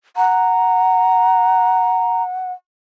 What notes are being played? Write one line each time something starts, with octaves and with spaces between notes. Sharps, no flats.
F#5 A#5